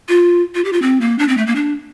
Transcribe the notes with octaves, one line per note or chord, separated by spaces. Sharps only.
F4
F4
G4
F4
C4
A#3
D4
C4
A3
A#3
D4